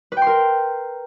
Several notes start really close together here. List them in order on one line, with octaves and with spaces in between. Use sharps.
B4 G5 C6 A#4